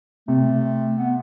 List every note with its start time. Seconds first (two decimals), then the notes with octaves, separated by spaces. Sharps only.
0.28 C3 A3
0.98 B3